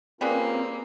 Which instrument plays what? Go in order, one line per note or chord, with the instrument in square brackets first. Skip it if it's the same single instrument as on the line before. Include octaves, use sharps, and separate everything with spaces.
[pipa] G3 G#4 B4 [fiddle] A#3 [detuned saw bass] C4 [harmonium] C#4 F4 A#4